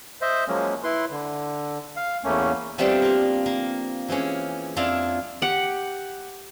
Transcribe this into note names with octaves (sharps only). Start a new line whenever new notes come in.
C5 D#5 E5
F3 F#3 G#3 A#3 C#4
E4 B4 C6
D3
F5
E2 A3 A#3 C#4
F3 G3 A3 B3 C4 D4
A#3 F4
A#3
E3 F3 G#3 C#4
F2 D4 E4 F4 A#5
G4 F#5